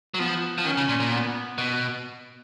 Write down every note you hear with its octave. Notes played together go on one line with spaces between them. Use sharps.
F#3
F3 B3
F3
D#3 C#4
C#3
A#2
A#2
B3
B2